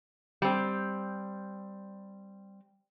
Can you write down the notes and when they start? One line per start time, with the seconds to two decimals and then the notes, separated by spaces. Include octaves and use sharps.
0.42 G3 C4